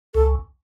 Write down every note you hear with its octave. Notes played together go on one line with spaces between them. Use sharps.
C#2 A4